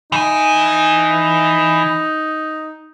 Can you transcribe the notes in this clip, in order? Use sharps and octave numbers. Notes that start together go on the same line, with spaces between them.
E3 D#4 G#5